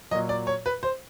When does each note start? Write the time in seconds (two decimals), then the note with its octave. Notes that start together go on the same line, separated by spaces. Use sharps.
0.11 A#2 F#3 D#5
0.29 D5
0.47 C#5
0.66 B4
0.83 C5